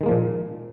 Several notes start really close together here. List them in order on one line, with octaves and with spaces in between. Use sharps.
D#3 G#3 A#3 F3 A#2